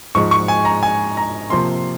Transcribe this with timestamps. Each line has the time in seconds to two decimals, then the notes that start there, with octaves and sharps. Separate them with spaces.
0.15 G#2 F3 G#3 C#6
0.31 C#6
0.48 G#5
0.65 A#5
0.83 G#5
1.17 A#5
1.50 C3 F3 A#3 C6